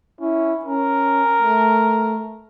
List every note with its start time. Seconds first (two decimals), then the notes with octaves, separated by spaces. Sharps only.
0.21 C#4 E4
0.65 C#4 A#4
1.42 A3